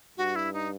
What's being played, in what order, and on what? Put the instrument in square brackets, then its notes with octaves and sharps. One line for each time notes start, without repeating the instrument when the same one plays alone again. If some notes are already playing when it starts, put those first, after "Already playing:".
[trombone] G2 [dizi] F#4
[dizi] E4
D#4